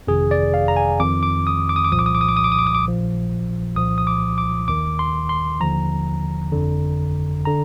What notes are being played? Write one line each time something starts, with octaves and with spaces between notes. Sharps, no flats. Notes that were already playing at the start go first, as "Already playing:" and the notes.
G1 F2 C3 D#3 G#4
D5
F5
A#5
G#5
F2 D#3 D6
D6
D#6
D6
D#6
D6
C2 A#2 F3 D#6
D6
D#6
D6
D#6
D6
D#6
D6
D#6
D6
D#6
D6
A#1 A#2 F3
C2 A#2 F3 D#6
D#6
D6
D6
D#2 D#3 D6
C6
C6
D#2 D3 F3 A#5
G1 F2 D3
D3 A#5